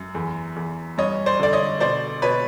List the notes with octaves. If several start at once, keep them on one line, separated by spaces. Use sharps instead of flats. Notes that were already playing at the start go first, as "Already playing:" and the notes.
Already playing: F#2
E2
E2
G2 C#5 D#5
C5 D5
D3 D5
C#5 D#5
B2 C5 D5
B2 B4 C#5